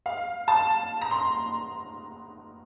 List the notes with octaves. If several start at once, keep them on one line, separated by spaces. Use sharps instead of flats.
F5
A5
A#5
C6